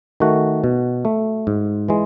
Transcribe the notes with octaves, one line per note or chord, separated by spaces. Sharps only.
D#3 A3 F#4
B2
A3
G#2
E3 G#3